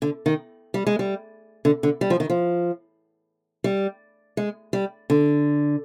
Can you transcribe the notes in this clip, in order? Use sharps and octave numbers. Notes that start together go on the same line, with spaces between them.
D3
D#3
G3
G#3
G3
D3
D3
G3
F3
D#3
F3
G3
G#3
G3
D3